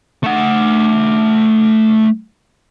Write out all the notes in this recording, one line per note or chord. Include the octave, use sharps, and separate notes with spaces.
A3 F#5